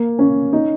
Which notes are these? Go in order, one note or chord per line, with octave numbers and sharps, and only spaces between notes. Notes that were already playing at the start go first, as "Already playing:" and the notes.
Already playing: A#3
C#4
D#4